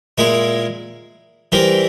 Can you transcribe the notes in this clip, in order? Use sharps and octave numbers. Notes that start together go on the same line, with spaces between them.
A#2 G#3 E4 A#4
E3 G3 C4 G4 A#4